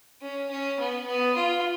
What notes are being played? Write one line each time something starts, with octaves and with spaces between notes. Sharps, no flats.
C#4
C#4
B3
B3
F4